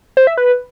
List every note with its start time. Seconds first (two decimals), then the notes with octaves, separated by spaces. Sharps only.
0.17 C5
0.27 E5
0.37 B4